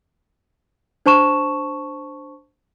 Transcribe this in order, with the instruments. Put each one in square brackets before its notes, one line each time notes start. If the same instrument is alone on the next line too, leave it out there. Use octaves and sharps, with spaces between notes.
[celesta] D4 C5 A5 C#6 E7